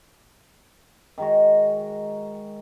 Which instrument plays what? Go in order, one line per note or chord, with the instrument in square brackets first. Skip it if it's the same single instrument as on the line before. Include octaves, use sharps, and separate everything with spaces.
[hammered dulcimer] D#3 G#3 F#4